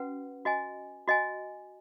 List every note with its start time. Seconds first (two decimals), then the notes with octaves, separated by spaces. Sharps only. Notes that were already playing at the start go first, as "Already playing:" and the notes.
Already playing: C#4 F#4 B4 F#5
0.45 F#4 D#5 G#5
1.08 F#4 D#5 G#5